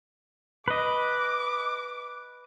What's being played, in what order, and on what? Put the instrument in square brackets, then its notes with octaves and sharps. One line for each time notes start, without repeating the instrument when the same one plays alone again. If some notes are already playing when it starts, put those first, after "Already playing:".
[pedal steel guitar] B4 D#5 [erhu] D6